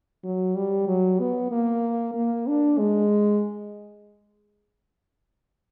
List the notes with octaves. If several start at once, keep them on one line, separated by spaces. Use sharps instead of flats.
F#3
G3
F#3
B3
A#3
A#3
D4
G#3